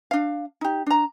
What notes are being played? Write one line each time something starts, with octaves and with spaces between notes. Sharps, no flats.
D4 F5
D#4 G4
D4 A#5